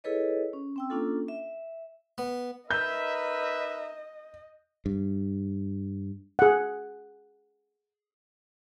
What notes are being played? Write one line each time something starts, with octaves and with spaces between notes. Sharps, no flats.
E4 G#4 A4 B4 C#5 D#5
C#4
C4 G5 E6
A#3 C#4 D4 F4 A4
E5
B3
D#4 A#4 B4 D#5 E5 G6
G2
G#4 F#5